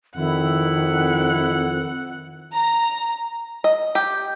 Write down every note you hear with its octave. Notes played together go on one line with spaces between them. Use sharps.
F2 D#3 E4 F#5
A#5
D#5
G4